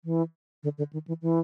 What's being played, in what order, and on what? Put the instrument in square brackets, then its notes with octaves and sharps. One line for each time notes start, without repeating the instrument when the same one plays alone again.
[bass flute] E3
D3
D3
D#3
E3
E3